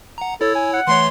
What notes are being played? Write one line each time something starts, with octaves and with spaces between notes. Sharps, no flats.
F#5 A#5
E4 A4 C#5 E6
G#5
F#5
E3 A3 C#5 C6